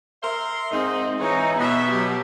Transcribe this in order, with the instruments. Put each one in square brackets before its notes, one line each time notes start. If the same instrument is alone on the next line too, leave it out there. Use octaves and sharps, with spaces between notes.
[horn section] A#4 E5 C6
[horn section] G#2 D#4 [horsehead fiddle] C4
[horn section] G#2 E3 [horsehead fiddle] D#4 C#5
[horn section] B2 [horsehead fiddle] B3 E5
[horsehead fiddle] F#3 G4